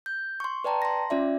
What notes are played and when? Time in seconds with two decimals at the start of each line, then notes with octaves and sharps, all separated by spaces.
0.06 G6
0.40 C6 C#6
0.64 B4 D5 G5 A5 A#5
0.82 C6 A#6
1.10 C#4 F4 D5 E5